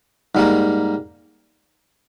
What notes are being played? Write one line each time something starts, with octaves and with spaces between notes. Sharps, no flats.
G#2 G3 A#3